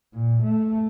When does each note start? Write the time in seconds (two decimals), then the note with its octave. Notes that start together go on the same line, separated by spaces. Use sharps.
0.14 A#2
0.42 A3